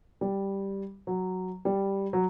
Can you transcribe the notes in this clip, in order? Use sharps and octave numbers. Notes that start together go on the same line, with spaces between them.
G3
F#3
G3
F#3